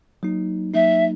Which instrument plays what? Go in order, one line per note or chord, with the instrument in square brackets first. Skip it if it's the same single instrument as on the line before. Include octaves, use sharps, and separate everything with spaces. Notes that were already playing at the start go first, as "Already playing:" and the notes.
[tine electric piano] F#3 A#3 D#4
[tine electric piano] F#3 A#3 D#4 [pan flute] E5